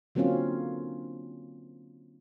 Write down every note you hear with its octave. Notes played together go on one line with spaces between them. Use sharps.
D3 F#3 A#3 C4 C#4 F4